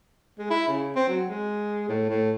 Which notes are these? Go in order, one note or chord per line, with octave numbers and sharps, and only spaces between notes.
G#3
E4
C#3
C4
F#3
G#3
A2
A2